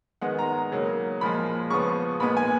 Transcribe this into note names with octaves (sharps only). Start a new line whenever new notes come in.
D#3 G#3 B3 F#5
A#5
C#3 F#3 A#3
A#2 F3 G#3 B5
C#3 F3 B3 C#6
A#2 G#3 B3 B5
G#5